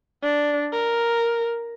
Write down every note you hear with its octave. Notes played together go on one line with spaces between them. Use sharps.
D4
A#4